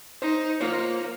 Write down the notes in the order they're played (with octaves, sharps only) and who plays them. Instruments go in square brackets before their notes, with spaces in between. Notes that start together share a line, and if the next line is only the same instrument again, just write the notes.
[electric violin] D#4 [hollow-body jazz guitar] C5
[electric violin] A#3 [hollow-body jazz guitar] F4 C5 C#5